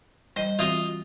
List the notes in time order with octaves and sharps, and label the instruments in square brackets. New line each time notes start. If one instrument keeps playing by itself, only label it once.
[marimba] G3 D#5 [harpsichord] C5
[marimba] E3 C4 F#4 [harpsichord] F4 D#5 F5